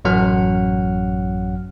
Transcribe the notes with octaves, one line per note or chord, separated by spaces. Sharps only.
A1 F#2 F#3 F#5 F6